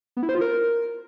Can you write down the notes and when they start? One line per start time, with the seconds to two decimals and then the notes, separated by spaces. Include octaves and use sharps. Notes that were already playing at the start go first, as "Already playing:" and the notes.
0.17 B3
0.23 E4
0.29 C5
0.35 F4
0.41 A#4